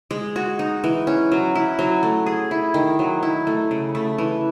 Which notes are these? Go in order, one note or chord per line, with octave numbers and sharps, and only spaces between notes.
G#3
F#4
D#4
E3
C#4
F#3
E4
F#3
A3
G#4
E4
D#3
F#3
E4
A3
C#3
A3
E3